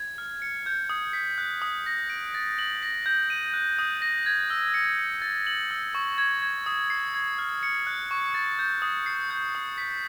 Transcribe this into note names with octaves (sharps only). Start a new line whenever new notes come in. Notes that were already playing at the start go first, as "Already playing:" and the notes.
Already playing: G#6
F6
C#7
G6
D#6
B6
F#6
D#6
A#6
D7
A6
F#7
A#6
G6
D#7
F#6
D#6
A#6
G#6
E6
C#7
C#7
A6
F#7
E6
C#6
G#6
G#6
D#6
C7
G#6
F6
C#7
F#6
C#6
A6
G6
D#6
C7
G6
D#6
B6